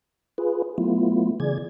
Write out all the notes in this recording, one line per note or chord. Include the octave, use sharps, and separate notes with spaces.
F4 G#4 B4
F#3 A3 B3 E4 F4
C#3 E3 G#4 D5 G#6